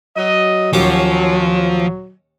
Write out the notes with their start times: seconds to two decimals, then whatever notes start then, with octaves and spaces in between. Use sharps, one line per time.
0.17 F#3 D#5
0.73 D#2 F3 F#3 C#4 G4